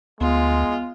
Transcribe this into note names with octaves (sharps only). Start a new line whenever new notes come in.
D2 G#3 B3 F4